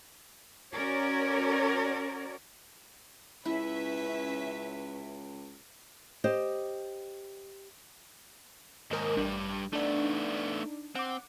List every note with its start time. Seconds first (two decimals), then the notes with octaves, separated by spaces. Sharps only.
0.73 C#4 F#4 A#4 C#5 D5
3.46 C#2 C#4 E4 B4 E5
6.24 G4 C5 D#5
8.91 D#2 G#2 A#4 D#5
9.17 A1 G2 G3 D4
9.73 A3 B3 D4 D#4 D5
10.95 C4 F#5 D6